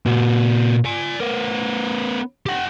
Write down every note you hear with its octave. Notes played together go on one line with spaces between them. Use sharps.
A#2 F#4
D5 G#5
B3 A#4
G4 F#5